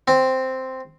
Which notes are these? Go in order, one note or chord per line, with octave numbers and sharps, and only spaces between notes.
C4